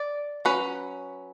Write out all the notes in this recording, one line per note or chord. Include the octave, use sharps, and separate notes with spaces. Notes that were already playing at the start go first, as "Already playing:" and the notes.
Already playing: D5
F#3 C#4 B4